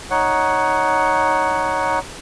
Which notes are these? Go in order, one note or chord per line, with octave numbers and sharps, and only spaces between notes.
D#4 C#5 F#5